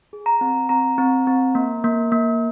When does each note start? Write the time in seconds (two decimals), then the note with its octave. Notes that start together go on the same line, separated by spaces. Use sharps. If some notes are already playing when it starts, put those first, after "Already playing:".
0.13 G#4
0.26 A#5
0.41 C4
0.69 C4 A#5
0.98 C4
1.27 C4
1.55 A#3
1.84 A#3
2.12 A#3